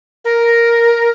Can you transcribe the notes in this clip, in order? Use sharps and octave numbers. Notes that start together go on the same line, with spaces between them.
A#4